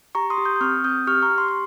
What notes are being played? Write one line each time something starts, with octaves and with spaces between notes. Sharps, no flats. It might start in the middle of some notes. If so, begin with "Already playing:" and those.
G4 A#5 C#6
C6 D#6
G4
D#6 G6
G6
C4 C#6 F6
C4 D#6 G6
G4 C#6 F6
A#5 C#6
G4
C6
C#6